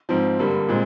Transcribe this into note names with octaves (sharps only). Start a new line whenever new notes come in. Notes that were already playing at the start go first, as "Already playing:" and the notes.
G#2 F3 C4
G2 D3 G3 A#3
A#2 G#3 C4